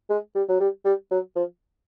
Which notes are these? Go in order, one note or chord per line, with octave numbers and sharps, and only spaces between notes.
G#3
G3
F#3
G3
G3
F#3
F3